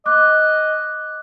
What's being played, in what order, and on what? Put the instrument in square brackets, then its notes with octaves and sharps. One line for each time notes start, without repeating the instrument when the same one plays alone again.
[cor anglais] D#5 [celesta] D6 F#6